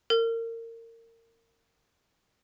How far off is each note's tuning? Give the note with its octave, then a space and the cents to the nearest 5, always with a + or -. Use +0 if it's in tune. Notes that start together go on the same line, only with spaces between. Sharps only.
A#4 -30